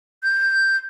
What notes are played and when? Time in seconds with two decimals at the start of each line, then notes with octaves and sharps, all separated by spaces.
0.23 G6